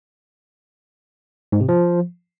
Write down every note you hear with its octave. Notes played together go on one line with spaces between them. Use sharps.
G#2
C3
F3